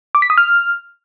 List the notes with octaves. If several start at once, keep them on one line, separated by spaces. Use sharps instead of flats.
D6
B6
D#6
F6